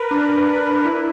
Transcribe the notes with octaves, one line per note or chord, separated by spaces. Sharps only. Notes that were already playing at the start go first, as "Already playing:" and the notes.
Already playing: A#4 B4
D4
D4
E4